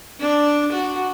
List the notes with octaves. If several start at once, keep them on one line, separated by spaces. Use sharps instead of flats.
D4
F#4